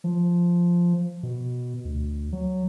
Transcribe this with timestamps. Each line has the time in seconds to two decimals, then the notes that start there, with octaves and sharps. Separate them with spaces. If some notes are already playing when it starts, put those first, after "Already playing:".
0.04 F3
1.23 B2
1.85 D2
2.32 F#3